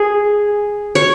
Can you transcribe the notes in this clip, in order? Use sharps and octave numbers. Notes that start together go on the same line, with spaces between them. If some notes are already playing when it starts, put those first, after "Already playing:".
Already playing: G#4
C#5